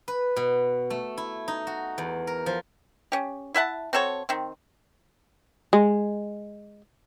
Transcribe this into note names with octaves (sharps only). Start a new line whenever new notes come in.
B4
B2
A3
E4
D#4
F#4
E2
A#4
F3
C#4 G4
E4 E5 F#5 A5
C4 F#4 A4 C#5
D#3 C4
G#3